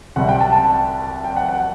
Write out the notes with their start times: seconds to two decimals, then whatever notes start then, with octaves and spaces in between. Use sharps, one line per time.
0.16 C2 C3 G3 F#5
0.29 G5
0.41 A5
0.52 A5
1.24 G5
1.36 F#5
1.49 F#5